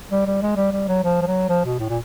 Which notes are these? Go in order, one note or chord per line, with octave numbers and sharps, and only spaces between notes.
G3
G3
G#3
G3
G3
F#3
F3
F3
F#3
F3
B2
A2
A#2